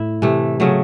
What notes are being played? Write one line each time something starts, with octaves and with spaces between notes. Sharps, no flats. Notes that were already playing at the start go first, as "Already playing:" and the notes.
Already playing: A2 E4
C3 E3 A3
C#3 F#3 A3